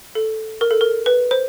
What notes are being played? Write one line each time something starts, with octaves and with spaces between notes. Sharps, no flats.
A4
A#4
A4
A#4
B4
C5